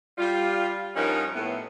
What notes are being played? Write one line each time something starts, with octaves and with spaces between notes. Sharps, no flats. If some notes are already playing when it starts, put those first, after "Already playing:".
G3 F4
G2 F3 C#4 D#4 A#4 F#5
A2 B3